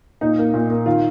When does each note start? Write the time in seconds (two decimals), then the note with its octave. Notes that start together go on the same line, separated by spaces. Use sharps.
0.21 A#2 D#4
0.38 A#3
0.54 A#2
0.70 A#3
0.86 D#3 F4